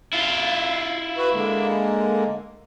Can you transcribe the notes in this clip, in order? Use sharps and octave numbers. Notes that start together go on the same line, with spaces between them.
E4 F4
F#4 B4
D3 G#3 A#3